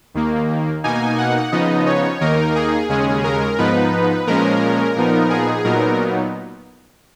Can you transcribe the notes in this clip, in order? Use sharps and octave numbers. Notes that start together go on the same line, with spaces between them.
D#2 D#3 A#3
B2 A#3 D#4 G#5
F#5
C#3 F3 B3 D#4 D#5
C#5
D#2 D#3 A#3 D#4 A#4
G#4
D#2 C#3 G#3 C#4 G#4
A#4
G#2 F3 B3 D#4 B4
A#2 F3 G#3 C#4 A#4
A#2 F3 B3 D#4
G#4
A#2 F#3 B3 D#4 A#4